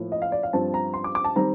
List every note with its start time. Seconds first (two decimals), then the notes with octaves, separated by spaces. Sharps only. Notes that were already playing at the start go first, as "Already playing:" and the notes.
Already playing: A2 F3 A#3
0.12 D#5
0.22 F5
0.32 D5
0.43 F5
0.53 G2 F3 C4 A5
0.74 A#5
0.94 C6
1.04 D6
1.15 D6
1.24 A5
1.36 D#3 G3 C4 A#5